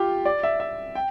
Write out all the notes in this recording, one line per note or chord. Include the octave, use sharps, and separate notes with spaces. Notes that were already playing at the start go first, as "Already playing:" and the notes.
Already playing: F4 G4
D5
E5
E5
G5